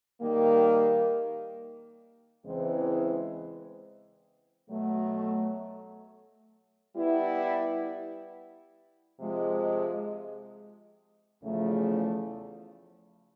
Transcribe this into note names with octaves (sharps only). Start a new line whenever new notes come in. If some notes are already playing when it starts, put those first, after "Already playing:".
D#3 G3 A#3
E2 C#3 E3 G#3 C4
B2 F#3 A3
G3 B3 E4
C3 F3 G#3
E2 C#3 F3 A3